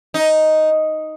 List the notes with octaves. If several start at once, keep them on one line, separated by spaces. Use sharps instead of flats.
D#4